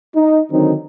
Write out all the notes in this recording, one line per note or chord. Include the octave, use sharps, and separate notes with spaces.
D#4
D3 D#3 F#3 C4 D#4